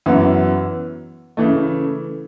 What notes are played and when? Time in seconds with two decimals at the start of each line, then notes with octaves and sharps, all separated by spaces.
0.06 F#2 E3 B3 F#4
1.37 C#3 E3 A3